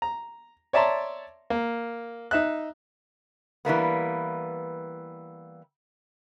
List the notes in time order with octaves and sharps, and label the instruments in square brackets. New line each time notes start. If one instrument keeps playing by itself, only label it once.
[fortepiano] A#5
C#5 D5 E5 A5 A#5 C6
A#3
D#4 E5 F#6
[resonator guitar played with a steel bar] E3 G3 A#3 B3